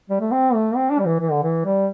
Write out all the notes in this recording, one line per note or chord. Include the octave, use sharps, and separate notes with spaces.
G3
A3
C4
A3
C4
D4
G3
E3
E3
D3
E3
G3